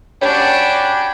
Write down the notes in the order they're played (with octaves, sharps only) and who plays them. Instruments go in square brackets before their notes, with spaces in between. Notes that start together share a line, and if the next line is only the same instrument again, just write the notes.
[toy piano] C#4 G4 C#5 [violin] D4 F#4 [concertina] G5 G#5 B5